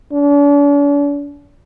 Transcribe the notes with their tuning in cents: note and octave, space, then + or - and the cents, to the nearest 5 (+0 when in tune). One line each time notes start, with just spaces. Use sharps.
D4 -45